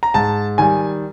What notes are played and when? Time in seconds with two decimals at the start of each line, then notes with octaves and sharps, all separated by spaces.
0.03 A#5
0.14 G#2 A5
0.58 D#3 G3 G#5